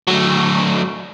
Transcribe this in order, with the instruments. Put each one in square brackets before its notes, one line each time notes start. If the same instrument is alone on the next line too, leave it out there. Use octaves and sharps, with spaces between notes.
[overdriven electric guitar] F#3 A3